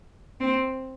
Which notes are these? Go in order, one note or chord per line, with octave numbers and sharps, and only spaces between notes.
C4